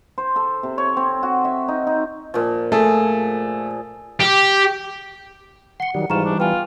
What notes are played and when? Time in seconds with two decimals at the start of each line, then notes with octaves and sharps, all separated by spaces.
0.18 C5
0.36 A4
0.63 C3
0.78 C#5
0.97 C4
1.23 F#4
1.45 E5
1.68 D#4
1.87 D#4
2.34 A#2 F3
2.72 A3 G#4
4.20 G4
5.80 F#5 C6 C#7
5.95 D#3 F#3 G3
6.10 G#2 E3 G3 F4 A#5 C#6 E7
6.25 D4
6.40 B3 F4 G5 G#5